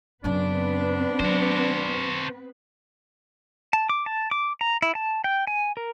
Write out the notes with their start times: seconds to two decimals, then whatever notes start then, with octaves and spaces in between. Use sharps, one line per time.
0.24 F#2 C#3 B3 C4 D4 B4
1.20 F#3 F#4 C5
3.73 A5
3.89 D6
4.06 A5
4.31 D6
4.61 A#5
4.82 E4
4.95 A5
5.24 G5
5.47 G#5
5.77 A#4